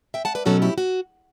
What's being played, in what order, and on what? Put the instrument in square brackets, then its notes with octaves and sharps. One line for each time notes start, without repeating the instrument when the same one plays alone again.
[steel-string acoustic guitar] E5 G5
F#5 A5
B4 D5
B2 F#3 A3 C#4 F#4 A4
E4 G4
F#4